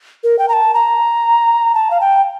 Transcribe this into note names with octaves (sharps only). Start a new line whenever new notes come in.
A#4
G5
A#5
A5
A#5
A5
F5
G5